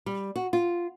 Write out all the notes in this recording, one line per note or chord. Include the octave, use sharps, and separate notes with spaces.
G3
F#4
F4